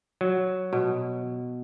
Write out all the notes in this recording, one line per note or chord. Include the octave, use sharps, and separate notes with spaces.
F#3
B2